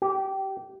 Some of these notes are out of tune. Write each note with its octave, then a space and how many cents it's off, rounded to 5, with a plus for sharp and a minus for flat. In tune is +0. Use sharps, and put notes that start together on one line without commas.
G4 -20